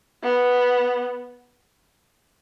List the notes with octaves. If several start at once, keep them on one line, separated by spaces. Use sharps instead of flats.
B3